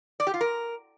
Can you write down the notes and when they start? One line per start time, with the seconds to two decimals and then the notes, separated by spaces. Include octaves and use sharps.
0.20 D5
0.27 G4
0.34 F4
0.41 A#4